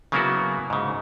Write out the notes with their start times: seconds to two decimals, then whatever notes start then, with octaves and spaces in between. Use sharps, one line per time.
0.12 C#3 F#3 A#3 B3 E4 F#4
0.70 G#2 C#3